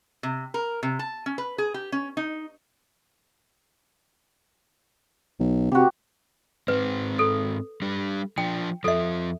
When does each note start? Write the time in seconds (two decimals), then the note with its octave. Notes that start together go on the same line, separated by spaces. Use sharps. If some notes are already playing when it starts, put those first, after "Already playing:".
0.23 C3
0.54 A#4
0.83 C3
0.99 A5
1.26 C#4
1.38 B4
1.58 G#4
1.74 G4
1.92 C#4
2.17 D#4
5.40 B1
5.72 C3 F#4 G4
6.68 G#2 C4 B4
7.19 A4
7.82 G3 D4
8.38 F3 D4 G5
8.84 F2 F3 A4 E5